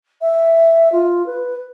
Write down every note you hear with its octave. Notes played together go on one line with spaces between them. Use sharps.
E5
F4
B4